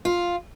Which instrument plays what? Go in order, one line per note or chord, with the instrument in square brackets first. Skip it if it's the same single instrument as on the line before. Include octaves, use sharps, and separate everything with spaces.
[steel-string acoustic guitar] F4